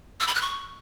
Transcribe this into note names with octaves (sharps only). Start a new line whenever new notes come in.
E6
B5
F#6
C#6